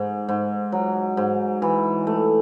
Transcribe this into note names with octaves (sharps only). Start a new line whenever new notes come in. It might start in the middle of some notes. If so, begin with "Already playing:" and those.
Already playing: G#2
G#2
F#3
G#2
E3
A3